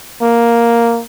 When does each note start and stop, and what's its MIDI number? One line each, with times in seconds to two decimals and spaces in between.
0.22 1.02 58